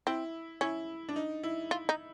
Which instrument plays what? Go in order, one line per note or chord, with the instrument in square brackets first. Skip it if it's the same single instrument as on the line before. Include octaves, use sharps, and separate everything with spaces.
[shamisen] C4 [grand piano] E4
[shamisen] C#4 [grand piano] E4
[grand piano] D4
D#4
E4
[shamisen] F4
D#4